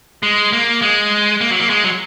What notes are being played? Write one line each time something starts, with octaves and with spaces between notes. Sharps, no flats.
G#3
A#3
G#3
A#3
F#3
A#3
G#3
F#3